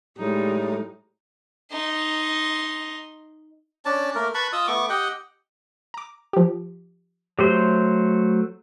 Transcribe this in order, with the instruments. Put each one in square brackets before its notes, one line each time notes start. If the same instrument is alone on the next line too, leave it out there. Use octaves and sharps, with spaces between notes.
[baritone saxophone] A2 [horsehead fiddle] G3 [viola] G#3 D#4
[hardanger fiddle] D#4 C6
[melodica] C#4 D4 A5
A3 A#3 A#4
B4 A5 B5 C#6
F4 D#5 D#6 E6
A3 B3 C#6 D6
G4 D#5 F#5 G5
[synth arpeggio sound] A#5 D6
F3 G4
[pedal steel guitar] F#3 A3 C5 [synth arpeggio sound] G4